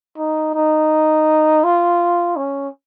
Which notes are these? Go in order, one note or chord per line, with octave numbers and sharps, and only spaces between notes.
D#4
D#4
F4
C#4